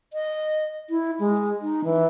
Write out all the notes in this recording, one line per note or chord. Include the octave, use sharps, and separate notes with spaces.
D#5
E4
G#3
D#4
E3